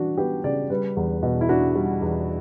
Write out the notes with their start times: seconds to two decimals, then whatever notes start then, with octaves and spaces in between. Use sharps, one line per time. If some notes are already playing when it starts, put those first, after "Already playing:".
Already playing: E3 D4 F#4
0.18 B3 G4
0.44 C#3 D5
0.70 G3 B4
0.97 E2
1.23 B2
1.41 E4
1.49 D4 F#4
1.75 G3
2.02 E2